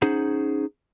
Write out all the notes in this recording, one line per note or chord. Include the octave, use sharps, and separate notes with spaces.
C#4 D#4 G#4 C5 F#5